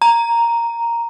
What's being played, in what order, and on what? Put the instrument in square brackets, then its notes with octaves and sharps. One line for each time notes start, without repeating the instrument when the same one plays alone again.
[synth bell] A#5